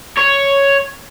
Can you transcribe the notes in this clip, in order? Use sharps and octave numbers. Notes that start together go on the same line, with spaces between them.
C#5